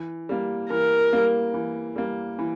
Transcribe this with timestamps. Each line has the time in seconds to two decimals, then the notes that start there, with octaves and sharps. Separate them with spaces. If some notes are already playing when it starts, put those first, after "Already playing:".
Already playing: E3
0.29 G3 A#3
0.70 E3 A#4
1.13 G3 A#3
1.54 E3
1.96 G3 A#3
2.39 E3